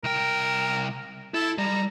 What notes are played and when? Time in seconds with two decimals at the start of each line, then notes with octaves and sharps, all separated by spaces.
0.04 C2 A#4 G5
1.34 E4 A4
1.58 G3 A#5